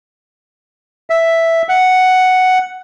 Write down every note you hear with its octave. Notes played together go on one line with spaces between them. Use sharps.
E5
F#5